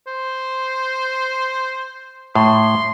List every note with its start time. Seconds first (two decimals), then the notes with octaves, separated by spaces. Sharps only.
0.07 C5
2.35 A2 C6